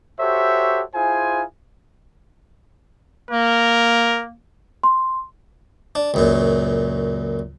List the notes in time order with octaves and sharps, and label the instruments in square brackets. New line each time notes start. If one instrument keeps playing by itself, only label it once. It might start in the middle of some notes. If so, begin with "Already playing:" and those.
[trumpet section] F#4 G4 A4 C5 C#5 E5
E4 F4 G#4 C5 G#5
[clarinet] A#3 [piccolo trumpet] A#4
[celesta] C6
[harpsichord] D4
C#2 F#2 A#2